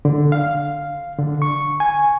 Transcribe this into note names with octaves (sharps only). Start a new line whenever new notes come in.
D3
F5
D3
C#6
G#5